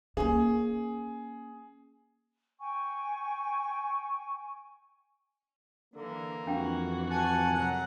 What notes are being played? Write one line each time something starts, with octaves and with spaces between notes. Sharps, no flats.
A#3 C#4 G#4
G5 G#5 C#6
D3 E3 A#3
F2 E3 D4 F#4 F5 G5
F#5 G#5 A5
C3 F#3 A#4 F#5 G#5 A#5